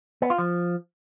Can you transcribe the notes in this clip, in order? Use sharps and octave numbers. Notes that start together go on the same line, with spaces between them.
B3
F4
F3